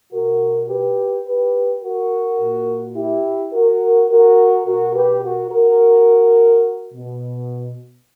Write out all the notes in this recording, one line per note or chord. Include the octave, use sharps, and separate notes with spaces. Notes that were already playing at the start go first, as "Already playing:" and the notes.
B2 F#4 A#4
G4 B4
G4 B4
F#4 A#4
A#2
E4 G4
F#4 A#4
F#4 A#4
B2 F#4 A#4
G4 B4
F#4 A#4
F#4 A#4
B2